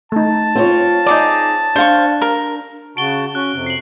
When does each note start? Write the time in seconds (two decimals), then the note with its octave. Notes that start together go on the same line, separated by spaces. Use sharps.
0.12 A3 D#4 A5
0.55 C4 F4 C#5
1.06 D#4 G#4 D5 D6
1.76 D4 C5 F5 C#6
2.21 A#4
2.97 C#3 F#4 A5 D7 G7
3.35 C#4 F#4 F#6
3.53 F2 C3
3.66 C7 F#7